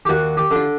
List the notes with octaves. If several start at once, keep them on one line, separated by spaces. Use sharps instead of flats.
G4
D#2 F#4
G4
D3 F4